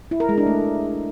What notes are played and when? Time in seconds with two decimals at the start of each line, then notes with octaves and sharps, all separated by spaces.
0.11 E4
0.20 A#4
0.29 G#3
0.38 D4
0.46 A3